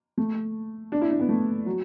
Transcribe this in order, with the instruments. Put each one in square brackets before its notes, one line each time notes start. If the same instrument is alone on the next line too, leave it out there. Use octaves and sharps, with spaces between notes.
[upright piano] A3
D4
E4
D4
B3
A3
F#3